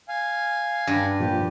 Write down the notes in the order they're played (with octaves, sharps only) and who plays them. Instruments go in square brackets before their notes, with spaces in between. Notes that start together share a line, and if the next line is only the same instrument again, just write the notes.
[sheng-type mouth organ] F5 G#5
[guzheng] G2
[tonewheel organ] A#2 F3 [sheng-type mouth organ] G4